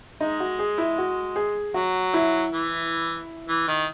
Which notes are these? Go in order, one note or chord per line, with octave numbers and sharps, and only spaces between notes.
G#3 D#4
F#4
G#4
E4
F#4
G#4
F#3 F#4
E4
E3
E3
D#3